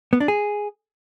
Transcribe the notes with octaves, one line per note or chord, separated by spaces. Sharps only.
B3
D4
G#4